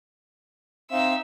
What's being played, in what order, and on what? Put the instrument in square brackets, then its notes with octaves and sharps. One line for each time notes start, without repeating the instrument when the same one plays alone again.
[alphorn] C4 [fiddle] D#4 E6 [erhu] E5 [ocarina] F5